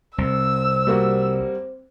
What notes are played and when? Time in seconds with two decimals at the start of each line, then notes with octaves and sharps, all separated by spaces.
0.18 C2 C4 E6
0.87 G3 A#3 F#4